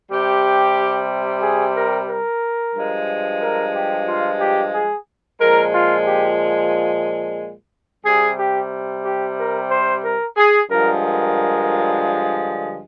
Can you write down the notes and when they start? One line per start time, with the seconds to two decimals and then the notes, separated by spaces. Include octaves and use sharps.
0.11 C3 G3 G4
1.42 G#4
1.76 A#4
2.09 A#4
2.75 G2 F3 G#3
3.41 A#4
3.75 G4
4.07 F4
4.41 G4
4.74 G#4
5.40 A#2 F3 G#3 A#4
5.73 F4
6.07 G4
8.05 C3 G3 G#4
8.39 G4
9.05 G4
9.38 A#4
9.71 C5
10.04 A#4
10.37 G#4
10.70 G2 D3 F3 G#3 A#4
11.03 A#4